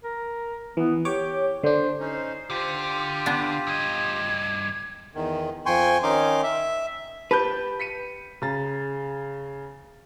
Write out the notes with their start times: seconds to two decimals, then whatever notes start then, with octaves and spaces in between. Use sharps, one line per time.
0.04 A#4
0.77 E3 B3
1.05 G4 C#5 D6
1.64 D3 D4 C5
1.99 C#4 D#4 C5
2.50 D3 F4 G4
3.26 B3 D4 F5
3.67 G2 D#5 G#6
5.15 E2 D#3
5.66 F2 G5 G#5 C6 C#6
6.03 D#3 C#4 D#4 C6 D6
6.43 E5
7.31 G4 B4 A5 B5 G6
7.80 B6 C#7 D#7
8.42 C#3 A#5 A6